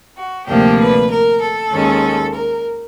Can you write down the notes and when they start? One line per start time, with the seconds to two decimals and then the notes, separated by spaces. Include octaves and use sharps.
0.17 F#4
0.47 D2 C3 F3 A#3 D4 G4
0.79 B4
1.10 A#4
1.41 A4
1.72 D#2 D#3 G#3 C#4
2.35 A#4